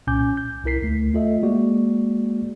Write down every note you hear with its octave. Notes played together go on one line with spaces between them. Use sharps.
C2 A#2 C#4 G#5 D6 G6
G6
C2 E4 A#4 B6 C7
D2 A3
A3 F4 A4 D#5 E5
G#3 A#3 F#4 G#4 D5